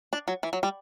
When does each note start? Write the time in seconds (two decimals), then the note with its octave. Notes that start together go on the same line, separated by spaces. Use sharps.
0.13 D4
0.28 F#3
0.43 E3
0.53 F#3
0.63 G3